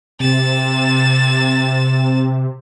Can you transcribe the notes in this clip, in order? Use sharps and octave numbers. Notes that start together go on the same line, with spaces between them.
C3 A6 E7